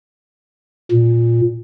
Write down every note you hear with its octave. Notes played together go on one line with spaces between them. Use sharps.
A#2